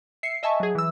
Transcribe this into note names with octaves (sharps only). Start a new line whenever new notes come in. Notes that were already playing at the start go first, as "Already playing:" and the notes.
E5 C7 C#7
D#5 E5 G#5 A5 C#6
F#3 G#4
E3 E6